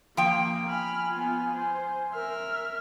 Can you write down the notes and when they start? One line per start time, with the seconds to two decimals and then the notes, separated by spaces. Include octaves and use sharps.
0.17 F3 A#3 G5
0.69 G#5 B5 F6
1.10 B3 F4
1.55 C5
2.14 A#4 E5 F6